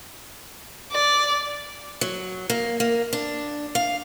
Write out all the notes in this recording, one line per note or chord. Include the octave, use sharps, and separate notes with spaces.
D5
F#3
A#3
A#3
D4
F5